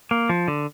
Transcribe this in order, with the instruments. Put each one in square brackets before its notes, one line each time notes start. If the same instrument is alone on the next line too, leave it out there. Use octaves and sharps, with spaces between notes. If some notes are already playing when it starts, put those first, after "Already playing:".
[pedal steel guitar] A#3
F3
D3